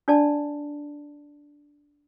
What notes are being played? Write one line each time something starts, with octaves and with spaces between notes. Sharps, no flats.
D4 D5 A5